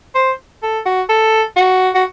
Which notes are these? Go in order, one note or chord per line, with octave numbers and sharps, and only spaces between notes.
C5
A4
F#4
A4
F#4
F#4